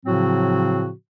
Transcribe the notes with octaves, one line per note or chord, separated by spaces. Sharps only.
A2 C#3 F3 F#3 C4 F#4